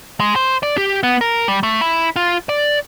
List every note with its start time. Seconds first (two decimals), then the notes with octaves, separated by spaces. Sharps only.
0.20 G#3
0.36 C5
0.63 D5
0.78 G4
1.03 B3
1.21 A#4
1.48 G3
1.63 A3
1.81 E4
2.16 F4
2.49 D5